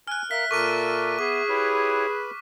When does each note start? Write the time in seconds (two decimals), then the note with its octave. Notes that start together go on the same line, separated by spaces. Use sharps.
0.07 G#5 F6 F#6
0.31 A#4 E5 F5 B6
0.51 A#2 A4 A#4 C#6 D6 D#7
1.19 B3 G#4 D6
1.49 E4 G4 B4 C#5 B5